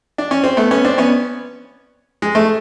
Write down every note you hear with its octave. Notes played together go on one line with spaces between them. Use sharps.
D4
C#4
C4
A3 B3
B3 C#4
C4 D4
B3 C#4
G#3
A3